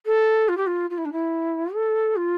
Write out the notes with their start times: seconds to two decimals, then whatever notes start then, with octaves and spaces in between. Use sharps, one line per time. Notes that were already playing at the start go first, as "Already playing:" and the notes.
0.06 A4
0.48 F4
0.57 G4
0.66 F4
0.90 F4
0.97 E4
1.05 D4
1.12 E4
1.74 A4
2.16 F4